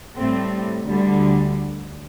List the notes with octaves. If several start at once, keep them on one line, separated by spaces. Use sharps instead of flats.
A2 G3 A3 C4
D2 D3 G3